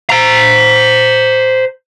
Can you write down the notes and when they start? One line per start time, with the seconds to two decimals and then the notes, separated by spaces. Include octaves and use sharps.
0.10 C5 A#5